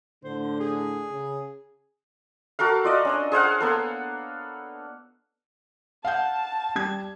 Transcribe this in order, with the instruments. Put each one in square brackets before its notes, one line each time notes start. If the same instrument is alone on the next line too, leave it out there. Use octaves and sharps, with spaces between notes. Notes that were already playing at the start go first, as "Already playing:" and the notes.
[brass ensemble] A2 D3 [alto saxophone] C5
[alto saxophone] G#4
[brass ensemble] C#3
[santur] F#4 A4 A#4 F5
F4 D5 D#5
C#4 D4 D#5
G#4 C5 F5 F#5
A#3 B3 A4
[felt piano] F5 F#5 G6 [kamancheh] A5
[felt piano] G3 G#6